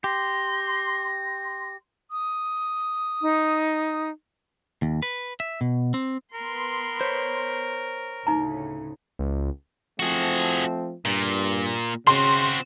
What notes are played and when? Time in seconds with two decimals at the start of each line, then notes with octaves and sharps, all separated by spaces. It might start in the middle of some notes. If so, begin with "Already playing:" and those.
0.04 G4 C6 A#6
2.11 D#6
3.22 D#4
4.82 D#2
5.02 B4
5.40 E5
5.61 B2
5.94 C4
6.34 B3 A#4 B5 C6
7.01 C5 C#5
8.27 D2 A2 C#3 D#4 A#5
9.19 C#2
10.00 F3 A3 C4 F#4 G#4
11.05 G2 A#2
12.07 C#3 C4 F#4 C6